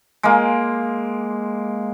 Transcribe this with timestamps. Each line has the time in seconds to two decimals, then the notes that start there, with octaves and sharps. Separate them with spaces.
0.23 G#3 A#3